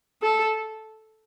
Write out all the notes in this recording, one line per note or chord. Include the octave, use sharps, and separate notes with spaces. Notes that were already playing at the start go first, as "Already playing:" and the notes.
A4